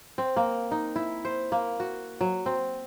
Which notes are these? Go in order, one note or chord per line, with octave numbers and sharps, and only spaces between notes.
C4
A#3
D#4
E4
C5
A#3
F#4
F#3
C4